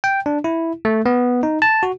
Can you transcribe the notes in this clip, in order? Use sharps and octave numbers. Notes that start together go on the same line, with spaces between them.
G5
D4
E4
A3
B3
D#4
A5
F#4